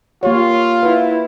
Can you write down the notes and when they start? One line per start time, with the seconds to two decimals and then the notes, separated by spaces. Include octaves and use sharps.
0.23 A#3 F4 G4 C#5
0.83 E4 B4 F#5